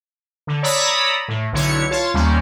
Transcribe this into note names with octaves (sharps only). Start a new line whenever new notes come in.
D3
C#5 D5 A#5 B5 D#6 E6
A2
B1 D3 E4 C#5 C#7
F4 C#5 A5
D#2 C3 G3 A#3 C#4